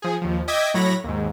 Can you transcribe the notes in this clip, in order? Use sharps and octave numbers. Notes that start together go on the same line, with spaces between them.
F3 G#4
D#2 F3
D#5 E5 G5 D6 G#6 B6
A2 F#3 C#5 B5 A#6
D#2 G#2